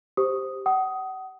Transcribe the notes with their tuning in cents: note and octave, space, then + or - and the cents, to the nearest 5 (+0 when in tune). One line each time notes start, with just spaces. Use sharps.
G4 +0 C5 +5 D#6 +0
F#5 +35 D#6 +10